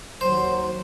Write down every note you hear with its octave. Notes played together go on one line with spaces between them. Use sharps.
D#2 D#3 F#3 C5